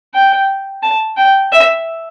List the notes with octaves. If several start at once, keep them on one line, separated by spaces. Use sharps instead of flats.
G5
A5
G5
E5